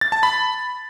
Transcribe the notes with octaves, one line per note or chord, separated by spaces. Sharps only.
A6
A5
B5